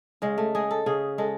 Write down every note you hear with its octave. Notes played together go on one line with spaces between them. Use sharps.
C#3 G#3
A3
G#3 G#4
A4
C#3 G#4
G#3 A4